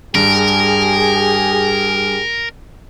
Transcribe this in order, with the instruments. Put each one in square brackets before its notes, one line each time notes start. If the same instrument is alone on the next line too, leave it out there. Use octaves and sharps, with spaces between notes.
[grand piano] G2 [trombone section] G4 G#4 [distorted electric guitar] A#4